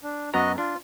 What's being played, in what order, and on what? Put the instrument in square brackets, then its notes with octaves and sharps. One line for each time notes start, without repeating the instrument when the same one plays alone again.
[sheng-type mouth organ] D4
[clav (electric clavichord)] F#2 B3 A#5 [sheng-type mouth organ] F#4 D#5
[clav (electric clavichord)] D4 [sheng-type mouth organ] F4